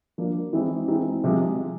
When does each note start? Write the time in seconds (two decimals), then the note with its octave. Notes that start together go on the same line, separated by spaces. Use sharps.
0.18 F3 A#3 D4
0.53 E3 G#3 C4 D#4
0.88 E3 G#3 C4 D#4
1.24 C3 F3 G#3